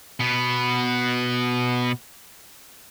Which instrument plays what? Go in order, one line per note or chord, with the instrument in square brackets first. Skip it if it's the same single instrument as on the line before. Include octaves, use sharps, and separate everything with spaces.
[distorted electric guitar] B2 B3